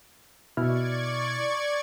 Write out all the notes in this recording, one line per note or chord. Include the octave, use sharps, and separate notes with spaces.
B2 E4 D5 C#6 F6 G#6